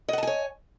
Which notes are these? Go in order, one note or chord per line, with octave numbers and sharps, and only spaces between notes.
C#5 D#5 F#5 G#5 A5